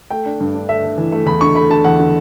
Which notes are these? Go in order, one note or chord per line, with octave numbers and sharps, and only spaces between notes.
A3 G5
D4
G2
D4
A3 E5
A3
E3
A3
E2 B5
D3 C#6
A3 B5
D3 A5
E2 F#5
D3